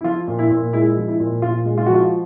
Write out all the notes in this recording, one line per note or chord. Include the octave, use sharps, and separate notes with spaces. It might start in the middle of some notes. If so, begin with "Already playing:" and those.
E4
F3 F4
A#2
E4
A#2
G#3 E4
F3
E4
A#2
A#2 F4
G#3
F4
F3 F#4
F4